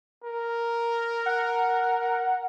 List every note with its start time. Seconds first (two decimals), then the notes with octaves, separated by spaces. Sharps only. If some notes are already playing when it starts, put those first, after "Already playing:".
0.25 A#4
1.26 F#5